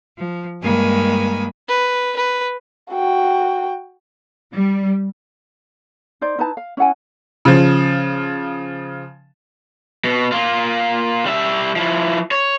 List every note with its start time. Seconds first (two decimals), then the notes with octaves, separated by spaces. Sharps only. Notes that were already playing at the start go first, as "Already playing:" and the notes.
0.16 F3
0.61 G2 D#3 G#3 A#3 G#5 B5
1.69 B4
2.16 B4
2.92 F#4 G5
4.54 G3
6.21 D#4 C5 D5
6.38 D#4 E4 B4 A5
6.57 F5
6.77 C#4 E4 F#5 G#5
7.45 C#3 F3
10.04 B2
10.32 A#3 F4
11.26 G3 E5
11.76 F3 E4
12.31 C#5